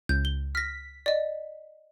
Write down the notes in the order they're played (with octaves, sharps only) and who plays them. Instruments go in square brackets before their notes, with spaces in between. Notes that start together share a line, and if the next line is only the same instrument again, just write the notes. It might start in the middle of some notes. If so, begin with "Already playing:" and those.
[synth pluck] C#2 [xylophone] G6
[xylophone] G7
[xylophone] F6 A#6 [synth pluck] B6
[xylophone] D5 D#5